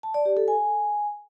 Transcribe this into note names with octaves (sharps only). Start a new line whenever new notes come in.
A5
D5
G4
A4
G#5